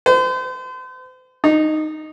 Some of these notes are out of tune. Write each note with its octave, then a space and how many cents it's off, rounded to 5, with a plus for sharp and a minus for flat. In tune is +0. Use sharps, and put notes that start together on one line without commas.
C5 -40
D#4 -10